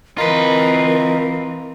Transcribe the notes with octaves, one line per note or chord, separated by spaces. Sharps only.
E3 C4 F4 A#4 B4 D#5 A#5